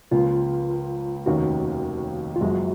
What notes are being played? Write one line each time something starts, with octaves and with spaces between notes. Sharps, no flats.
C#2 C#3 F3 A#3 F4
F1 D#2 D#3 A#3 C#4 F#4
F4
F#1 F#2 F3 G#3 F#4